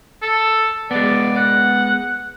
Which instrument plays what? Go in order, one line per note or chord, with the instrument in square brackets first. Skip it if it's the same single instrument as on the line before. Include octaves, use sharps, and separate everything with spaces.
[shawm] A4
[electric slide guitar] G#3 B3 [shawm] D5
[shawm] F#5